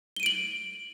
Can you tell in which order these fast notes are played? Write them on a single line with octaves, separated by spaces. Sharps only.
G7 D#7 D7 F#7